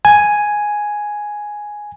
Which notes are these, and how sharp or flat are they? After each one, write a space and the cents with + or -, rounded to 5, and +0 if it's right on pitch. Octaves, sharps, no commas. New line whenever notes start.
G#5 +5